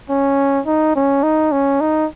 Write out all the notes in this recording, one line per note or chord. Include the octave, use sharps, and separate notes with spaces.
C#4
D#4
C#4
D#4
C#4
D#4